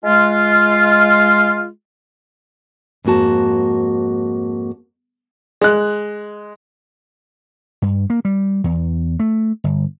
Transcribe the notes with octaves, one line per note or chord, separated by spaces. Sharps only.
G#3 F4
F2 G#2 A#3 F#4 A5
G#3 F#6
G2
A#3
G3
E2
A3
G1